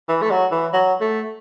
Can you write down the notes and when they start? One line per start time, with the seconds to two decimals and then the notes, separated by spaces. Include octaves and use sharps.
0.09 E3
0.22 A3
0.31 F#3
0.52 E3
0.73 F#3
1.01 A3